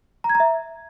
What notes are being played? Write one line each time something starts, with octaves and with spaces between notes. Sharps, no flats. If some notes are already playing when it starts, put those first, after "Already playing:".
A#5
G#6
A#5
E5